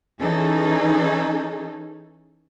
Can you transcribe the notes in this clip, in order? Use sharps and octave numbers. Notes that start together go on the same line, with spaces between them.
E3 C#4 D#4 G#4 A4